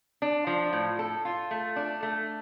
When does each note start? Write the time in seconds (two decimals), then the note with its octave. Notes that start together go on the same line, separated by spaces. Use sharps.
0.22 D4
0.47 F3
0.73 A2
0.99 A4
1.25 F4
1.51 A3
1.76 D4
2.03 A3